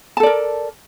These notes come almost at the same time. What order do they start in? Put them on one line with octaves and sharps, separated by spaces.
A5 A4 D5 A#4